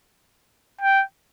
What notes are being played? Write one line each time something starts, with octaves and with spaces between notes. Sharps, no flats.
G5